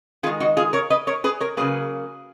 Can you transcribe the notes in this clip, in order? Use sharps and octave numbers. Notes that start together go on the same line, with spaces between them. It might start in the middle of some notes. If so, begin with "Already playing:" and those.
D#3 G#3 F4 G#4
D#4 F#4
F4 G#4
A#4 C#5
B4 D#5
A#4 C#5
G#4 B4
A#4 C#5
C#3 F#3 A#3 G#4 B4